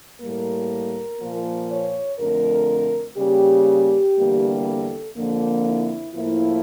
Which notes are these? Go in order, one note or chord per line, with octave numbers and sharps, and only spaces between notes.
A2 G3 A#3 A#4
A#2 F3 A#3
C#5
F2 D3 A3 A#4
C#3 G3 A#3 G4
E2 D3 G3 A#3
A4
F2 D3 F3 A#3
E4
A2 F3 A#3 E4